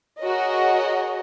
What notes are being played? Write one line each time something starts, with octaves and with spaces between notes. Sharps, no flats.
F#4 G#4 A#4 C#5 D#5